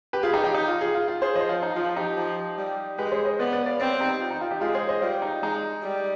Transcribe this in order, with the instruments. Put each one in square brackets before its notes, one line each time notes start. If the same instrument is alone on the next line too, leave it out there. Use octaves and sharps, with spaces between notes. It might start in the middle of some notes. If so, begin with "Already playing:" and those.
[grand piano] G4 B4
F4 G#4
D#4 G4
D#4 G4
D#4
F4
F4 G#4
F4
F4
G#4 C5
[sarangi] F3 [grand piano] C5 D#5
[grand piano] F4
D#4
[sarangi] F3 [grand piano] F4
[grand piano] D#4 G4
[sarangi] F3
G3
[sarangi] G#3 [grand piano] G4 B4
[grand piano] G#4 C5
C5 D#5
[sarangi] B3 [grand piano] B4 D5
[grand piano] B4 D5
D5 F5
[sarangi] C4 [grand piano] B4 D5
[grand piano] D#4 G4
F4
D#4
F4
D#4 G4
[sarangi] G#3 [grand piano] F4 G#4
[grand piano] G#4 C5
C5 D#5
[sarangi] G3 [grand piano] F4
[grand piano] D#4
[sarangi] G#3 [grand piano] D#4
[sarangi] G3